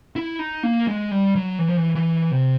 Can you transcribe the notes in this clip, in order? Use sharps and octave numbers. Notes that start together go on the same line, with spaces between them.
E4
D#4
A#3
G#3
G3
F#3
E3
F3
E3
E3
C3